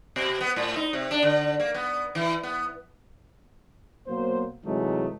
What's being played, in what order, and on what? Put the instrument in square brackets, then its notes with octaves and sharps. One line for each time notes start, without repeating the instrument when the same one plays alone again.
[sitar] B2
B3
A2
D#4
C3
D4
D3
A#3
B3
E3
B3
[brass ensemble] B2 F#3 A#3 C5
C3 E3 F#3 G#3 A3 D#4